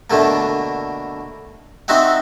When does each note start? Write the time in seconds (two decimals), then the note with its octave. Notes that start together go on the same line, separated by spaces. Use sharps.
0.10 B2 D3 A3 A#3
1.88 C4 D#4 F#4 E5 F#5